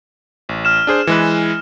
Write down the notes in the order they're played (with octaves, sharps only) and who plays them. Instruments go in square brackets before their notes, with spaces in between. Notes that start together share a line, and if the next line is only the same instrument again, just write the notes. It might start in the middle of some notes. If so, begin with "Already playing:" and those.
[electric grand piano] A1
[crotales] F6 E7
[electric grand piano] D4 G#4 C5
E3 G#3 B4